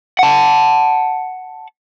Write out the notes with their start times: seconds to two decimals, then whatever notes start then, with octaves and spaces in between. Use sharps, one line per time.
0.19 F#5 A5